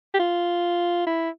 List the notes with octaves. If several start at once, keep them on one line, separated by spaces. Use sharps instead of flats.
G4
F4
E4